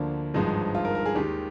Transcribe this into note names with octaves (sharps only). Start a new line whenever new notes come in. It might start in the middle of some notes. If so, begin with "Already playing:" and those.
Already playing: D2 D3 F3 A#3 D4
G#1 G2 F3 G#3 D#4
F4
A#4
A#4
G#4
D#2 D#3 G#3 G4